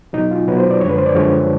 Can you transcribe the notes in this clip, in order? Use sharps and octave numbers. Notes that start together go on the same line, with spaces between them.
B2 F#3 D#4
F4
B2 F#3 B4
C5
D5
F#2 D3 F3 G#3 C#5
B4
C5
D5
F#2 D3 F3 G#3 C#5